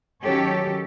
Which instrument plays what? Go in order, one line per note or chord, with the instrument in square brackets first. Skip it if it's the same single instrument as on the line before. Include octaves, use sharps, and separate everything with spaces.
[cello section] D#3 F#3 C#4 G4 A4 C#5